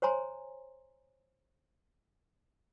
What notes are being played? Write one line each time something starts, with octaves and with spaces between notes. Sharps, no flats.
C5 C#5 G#5 A#5 C6